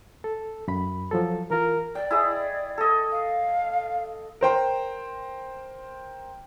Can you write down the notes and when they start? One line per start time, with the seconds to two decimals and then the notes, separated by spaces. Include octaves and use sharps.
0.24 A4
0.68 F#2 B5
1.11 F3 F#3 A4
1.51 E3 F4 A#4
1.95 D5 G5
2.11 E4 G#4 D#5
2.78 A4 D#5
3.12 F5
4.41 A#4 C5 G5 C6